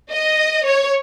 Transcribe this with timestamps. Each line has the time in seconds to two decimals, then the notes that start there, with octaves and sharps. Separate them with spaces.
0.11 D#5
0.66 C#5